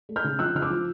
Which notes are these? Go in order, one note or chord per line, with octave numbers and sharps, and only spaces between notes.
A3
F6 G6
C#3
F3 E6 F#6
C#3 F6
D6 E6
F3